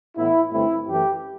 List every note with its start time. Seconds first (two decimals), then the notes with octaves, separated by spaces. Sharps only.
0.16 A2 E3 B3 E4
0.52 G2 D3 A3 C4 E4
0.88 F#2 E3 A3 G4